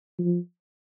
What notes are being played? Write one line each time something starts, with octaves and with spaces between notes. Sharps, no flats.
F3